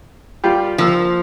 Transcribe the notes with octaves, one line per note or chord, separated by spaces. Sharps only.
G3 F4 G4
F3 A#3 E6